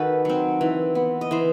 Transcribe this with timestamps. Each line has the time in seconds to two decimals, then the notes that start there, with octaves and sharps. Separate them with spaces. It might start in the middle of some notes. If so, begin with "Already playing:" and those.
Already playing: D#3 F#4 A4 B4
0.25 F#3 C4
0.61 E3
0.95 B3
1.21 D#5
1.31 E3 C5